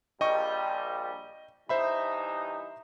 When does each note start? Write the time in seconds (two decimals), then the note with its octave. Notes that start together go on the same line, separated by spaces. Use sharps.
0.21 A#1 G3 D#5 G5 C#6
1.69 G2 E3 D#4 C5 E5 B5